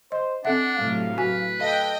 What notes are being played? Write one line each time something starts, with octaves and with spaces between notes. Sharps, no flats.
C5 D#5
C4 D4 A4 E5 F#5
A2 C3 F#3 F5
F#4 B4 G#5
A4 D#5 F5 G5